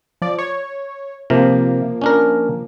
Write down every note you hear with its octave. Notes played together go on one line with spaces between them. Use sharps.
F3 D5
C#5
C3 F3 A#3
C#4 D4 A#4